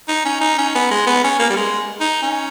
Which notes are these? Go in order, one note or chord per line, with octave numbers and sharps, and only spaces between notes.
D#4
C#4
D#4
C#4
B3
G#3
B3
C#4
A#3
G3
G#3
D#4
C#4